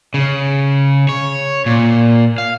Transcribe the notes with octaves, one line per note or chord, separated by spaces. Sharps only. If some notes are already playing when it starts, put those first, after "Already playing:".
C#3
C#5
A#2
F5